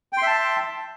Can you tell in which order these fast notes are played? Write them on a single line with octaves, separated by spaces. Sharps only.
G5 C6 E5 A5